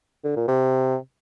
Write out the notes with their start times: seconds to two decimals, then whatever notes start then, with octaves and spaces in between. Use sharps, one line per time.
0.24 D3
0.36 A#2
0.48 C3